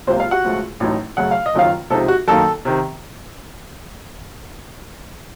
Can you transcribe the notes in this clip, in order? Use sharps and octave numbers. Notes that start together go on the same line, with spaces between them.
C#2 C3 F#3 A#3 C4 C5
F4 F5
F#4 F#5
C#2 C#3 F3 A3
A1 A2 F#3 A3 D#4
F#2 C#3 A3 F#5
F5
D#5
F#1 F#2 D#3 F#3 F4 F5
C#2 C3 F3 C4 D#4 A4
F#4
F#2 D#3 A#3 D#4 A4
C3 D#3